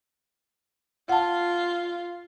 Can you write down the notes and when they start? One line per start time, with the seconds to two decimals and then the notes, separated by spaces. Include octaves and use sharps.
1.09 F4 F#5 A5